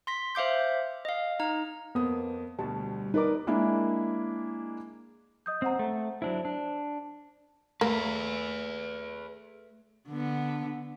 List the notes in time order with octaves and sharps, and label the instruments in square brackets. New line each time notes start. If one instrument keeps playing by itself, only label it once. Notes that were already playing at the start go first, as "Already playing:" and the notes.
[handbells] C6 A#6 B6
C5 E5 F5 D6 G6
D#5 F5
D#4 A#5
[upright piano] F2 A#3 D#6 [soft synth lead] B3
[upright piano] D2 B2 [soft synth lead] G3 [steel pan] A5
[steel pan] D#4 A#4 D6 [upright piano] B4 D5 A#5
[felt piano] G#3 A#3 D4 E4
[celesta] D#5 D#6 G6
[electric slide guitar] C4 [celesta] C5 F#5 A#5
[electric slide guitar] A3
[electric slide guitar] F#3 D4 E4 [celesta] C5
[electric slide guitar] D4
[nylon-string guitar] A3 [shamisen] A#3 [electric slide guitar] G#4 B4
[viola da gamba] D3 B3